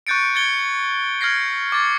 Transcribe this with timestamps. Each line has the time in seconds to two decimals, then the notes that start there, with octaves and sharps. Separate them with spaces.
0.07 C#6 F#6 G6 A6 C#7 D7
0.35 G#6 A6 C#7 G7
1.21 F6 G#6 A#6 C7
1.72 D6 A6 C#7